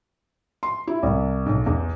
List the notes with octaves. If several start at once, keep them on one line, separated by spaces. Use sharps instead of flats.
C6
E4
C2
B1
E2